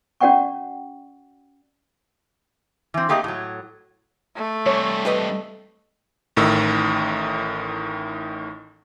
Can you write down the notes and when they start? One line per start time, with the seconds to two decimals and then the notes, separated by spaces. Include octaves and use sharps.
0.21 C#4 F#4 D5 F#5 G5 C#6
2.94 E3 C4
3.09 A3 A#3 G4 G#4 C5 D#5
3.24 A2 F#3
4.36 A3
4.66 G2 C3 C#5
5.05 G4 B4 D#5
6.37 A1 A2 D#3 E6